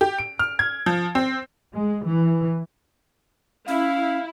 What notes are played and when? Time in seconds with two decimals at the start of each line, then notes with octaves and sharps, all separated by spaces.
0.01 G4
0.18 D7
0.39 F6
0.59 G#6
0.86 F3
1.15 C4
1.72 G#3
2.04 E3
3.68 C#4 E4 F5